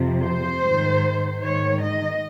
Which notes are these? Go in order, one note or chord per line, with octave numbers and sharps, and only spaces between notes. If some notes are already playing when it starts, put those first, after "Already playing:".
Already playing: F2 C3 F3
C5
G#2 D#3
G#2 D#3 C#5
D#5